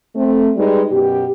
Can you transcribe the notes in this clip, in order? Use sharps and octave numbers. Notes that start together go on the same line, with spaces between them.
A3 C4
G3 G#3 D#4 B4
F#2 B2 G4